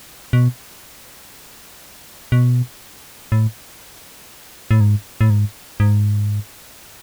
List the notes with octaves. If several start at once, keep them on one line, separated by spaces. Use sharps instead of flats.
B2
B2
A2
A2
G#2
A2
G#2
G#2